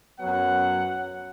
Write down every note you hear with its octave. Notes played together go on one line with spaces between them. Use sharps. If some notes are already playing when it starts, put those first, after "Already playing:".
F#2 F#3 B3 F#5